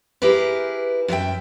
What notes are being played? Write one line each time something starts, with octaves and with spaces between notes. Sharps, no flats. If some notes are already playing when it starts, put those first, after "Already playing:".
E4 G4 G#4 A#4 B4
F#2 F4 A#4 E5 G5